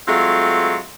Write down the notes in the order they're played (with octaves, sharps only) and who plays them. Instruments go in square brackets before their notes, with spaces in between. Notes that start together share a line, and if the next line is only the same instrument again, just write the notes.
[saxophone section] F#3 G#3 A3 C4 F4